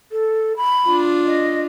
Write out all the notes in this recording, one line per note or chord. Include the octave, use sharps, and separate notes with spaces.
A4
B5
D4 F4
D#5